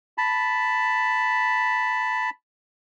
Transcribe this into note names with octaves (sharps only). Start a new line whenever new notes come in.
A5 B5